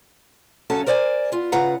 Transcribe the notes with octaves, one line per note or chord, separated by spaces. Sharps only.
F#2 C#3 C#4 F#4 A4 A5
A#4 C5 D5 F#5 G#5
B3 F4
C#3 F4 B4 F#5 A#5